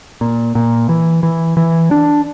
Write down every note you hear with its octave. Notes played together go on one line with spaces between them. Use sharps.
A#2
A#2
E3
E3
E3
D4